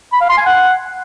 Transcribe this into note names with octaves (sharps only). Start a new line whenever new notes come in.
B5
F5
C6
G#5
F#5